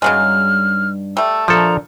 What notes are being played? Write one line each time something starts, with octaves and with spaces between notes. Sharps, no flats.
G2 C#3 F#3 G#3 D#4 F6
G3 A3 E6
A#2 F3 D4 A4 A#5